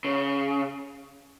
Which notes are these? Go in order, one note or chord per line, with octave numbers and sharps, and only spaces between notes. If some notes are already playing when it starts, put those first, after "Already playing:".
C#3